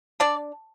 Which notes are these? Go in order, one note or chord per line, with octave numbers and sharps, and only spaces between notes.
D4 D5